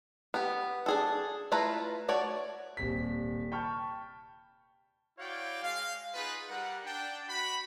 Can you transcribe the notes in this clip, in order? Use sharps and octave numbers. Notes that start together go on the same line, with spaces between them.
B3 G4
D4 G#4 A4
A3 E4 F4 B4 A#5
A3 F#4 C#5 D5
D#1 C3 B6
G5 A5 B5 C#6 F6 G6
E4 F#4 C#5 D5 F5 G5
G#3 F5
B3 D#4 F4 G#4 B4
G3 A#4 F#5
D4 G5
F#4 B5